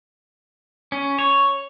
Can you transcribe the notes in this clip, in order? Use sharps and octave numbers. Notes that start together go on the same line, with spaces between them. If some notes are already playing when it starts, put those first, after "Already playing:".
C#4
C#5